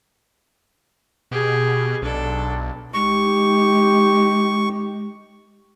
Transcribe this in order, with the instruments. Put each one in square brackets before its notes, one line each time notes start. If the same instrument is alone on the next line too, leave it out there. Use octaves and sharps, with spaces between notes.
[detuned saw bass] B2 [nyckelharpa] G4 G#4
[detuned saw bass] B1 [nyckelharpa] D4 A4
[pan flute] G#3 [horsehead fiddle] D#4 G4 [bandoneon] C#6